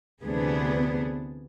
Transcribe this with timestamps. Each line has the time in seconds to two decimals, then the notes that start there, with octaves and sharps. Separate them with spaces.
0.23 D2 C3 E3 B3 D4 G#4